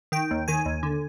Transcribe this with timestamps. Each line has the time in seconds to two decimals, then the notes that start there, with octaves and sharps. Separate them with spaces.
0.12 D#3 G5
0.31 D#2
0.48 D#3 G#5
0.66 D#2
0.83 D3